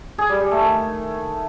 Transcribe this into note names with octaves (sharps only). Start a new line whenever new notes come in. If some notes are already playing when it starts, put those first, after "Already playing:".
G#4
G3
G3
A3
D#3